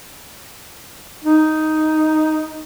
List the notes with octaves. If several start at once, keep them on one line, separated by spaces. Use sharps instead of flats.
D#4